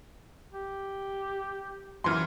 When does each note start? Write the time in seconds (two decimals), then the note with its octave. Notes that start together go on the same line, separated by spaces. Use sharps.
0.53 G4
2.04 F#2 E3 C6 F6